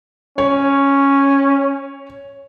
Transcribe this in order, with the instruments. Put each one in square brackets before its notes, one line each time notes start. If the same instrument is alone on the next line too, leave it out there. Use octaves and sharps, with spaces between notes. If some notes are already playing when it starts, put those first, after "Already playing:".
[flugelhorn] C#4 [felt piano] C#5